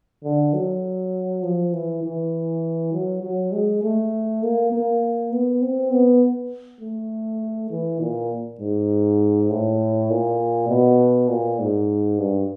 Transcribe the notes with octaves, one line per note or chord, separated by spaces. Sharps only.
D3
F#3
F3
E3
E3
F#3
F#3
G#3
A3
A#3
A#3
B3
C4
B3
A3
E3
A#2
G#2
A2
A#2
B2
A#2
G#2
G2